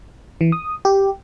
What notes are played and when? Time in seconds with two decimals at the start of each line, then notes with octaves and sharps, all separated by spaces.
0.41 E3
0.52 D#6
0.85 G4